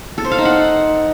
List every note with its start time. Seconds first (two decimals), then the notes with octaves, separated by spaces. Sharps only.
0.18 A4
0.25 C5
0.31 F5
0.38 D#4
0.45 F#5